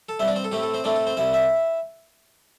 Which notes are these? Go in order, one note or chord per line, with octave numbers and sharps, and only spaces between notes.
A4 A5
G2 G3 C4 E4 E5
D4 D5
C4 C5
A4
A2 A3 C4 E4 G4
A4
C4 C5
A2 A3 C4 D4 E4 D5
A4
C4 C5
C2 C3 G3 E4 E5
E4 E5